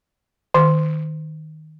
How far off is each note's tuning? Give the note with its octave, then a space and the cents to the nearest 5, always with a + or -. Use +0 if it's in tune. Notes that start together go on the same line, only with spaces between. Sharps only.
D#3 +0 D6 +25